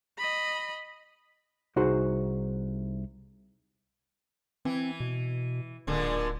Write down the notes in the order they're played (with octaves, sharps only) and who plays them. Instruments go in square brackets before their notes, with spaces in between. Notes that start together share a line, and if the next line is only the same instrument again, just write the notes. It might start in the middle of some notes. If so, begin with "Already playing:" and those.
[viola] D#5 B5
[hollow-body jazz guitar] C2 D#4 F#4 G#4 C5 C6
[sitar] E3 [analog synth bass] C4
[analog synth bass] B2
[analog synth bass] D1 [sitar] A#2 D3 G#3